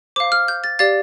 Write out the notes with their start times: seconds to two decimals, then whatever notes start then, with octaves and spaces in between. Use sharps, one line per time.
0.16 C5 F5 D6
0.32 F6
0.48 G6
0.64 A6
0.79 G4 D5 F5 A6